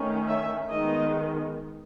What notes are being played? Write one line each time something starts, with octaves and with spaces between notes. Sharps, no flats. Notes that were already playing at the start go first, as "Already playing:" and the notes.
Already playing: D#3 A3 C#4
E5
D#3 G#3 B3 D#5